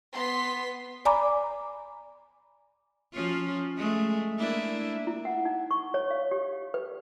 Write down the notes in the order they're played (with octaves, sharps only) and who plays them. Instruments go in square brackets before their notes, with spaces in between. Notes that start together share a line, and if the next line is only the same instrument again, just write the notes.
[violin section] B3 C6 B6
[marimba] D5 G#5 A#5 B5 D6
[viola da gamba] F3 C#4 F4
G#3 A3
A#3 D4 E4
[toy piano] E4
F#5
D#4
C#6
C#5
F5
G4
B4